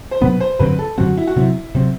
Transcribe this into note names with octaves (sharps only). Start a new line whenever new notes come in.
C5
B2 F#3 B3 D4 B4
C5
G2 D3 F#3 C4 B4
A4
G2 D3 F#3 C4 F#4
E4
F#4
C3 F#3 C4 E4
C3 F#3 C4